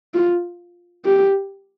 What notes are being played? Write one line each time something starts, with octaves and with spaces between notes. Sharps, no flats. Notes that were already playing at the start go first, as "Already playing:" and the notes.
F4
G4